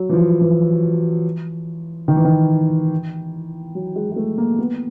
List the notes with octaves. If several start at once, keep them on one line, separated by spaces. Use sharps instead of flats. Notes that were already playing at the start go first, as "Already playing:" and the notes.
Already playing: F#3
E3
F3
E3
D#3
E3
D#3
F#3
G#3
G#3
A3
A#3
B3